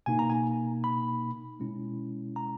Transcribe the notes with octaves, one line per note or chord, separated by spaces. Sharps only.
B2 A#3 D#4 G#5
A#5
G#5
B5
B2 G#3 C#4 E4
A#5